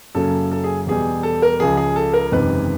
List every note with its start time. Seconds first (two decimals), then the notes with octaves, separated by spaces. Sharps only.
0.15 F#2 C#3 F#3 A#3 C#4 A4
0.51 A4
0.64 G#4
0.87 E2 B2 G3 G#4
1.23 A4
1.42 A#4
1.60 C#2 C#3 F3 G#4
1.77 G#4
1.96 A4
2.13 A#4
2.32 F#1 E2 C3 D#3 G#3 B4